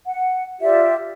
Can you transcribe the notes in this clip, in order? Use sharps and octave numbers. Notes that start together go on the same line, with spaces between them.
F#5
F4 G4 D5 E5